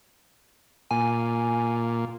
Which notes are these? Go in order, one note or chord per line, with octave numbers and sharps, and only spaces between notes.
A#2 G#5